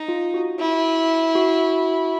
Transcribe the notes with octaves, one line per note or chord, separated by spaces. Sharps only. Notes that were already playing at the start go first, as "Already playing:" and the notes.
Already playing: D#4
F4
F#4
E4
F#4